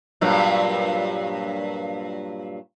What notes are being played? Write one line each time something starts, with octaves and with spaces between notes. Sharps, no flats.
G2 A#2 F#3